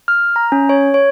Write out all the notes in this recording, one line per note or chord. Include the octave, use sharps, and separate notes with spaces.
F6
A#5
C#4
C#5
C#5